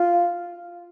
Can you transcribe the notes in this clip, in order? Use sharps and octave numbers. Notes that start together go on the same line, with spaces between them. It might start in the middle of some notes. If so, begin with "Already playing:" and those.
Already playing: F4